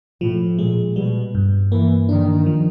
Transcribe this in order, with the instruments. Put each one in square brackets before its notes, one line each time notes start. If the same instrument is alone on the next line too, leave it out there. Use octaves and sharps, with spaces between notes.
[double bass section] A2 [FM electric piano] F3
[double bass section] A#2 [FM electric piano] G#3
[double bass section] B2 [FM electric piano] G3
[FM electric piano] G2
[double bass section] E3 [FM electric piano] A#3
[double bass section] D#3 [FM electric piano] D4
[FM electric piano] F3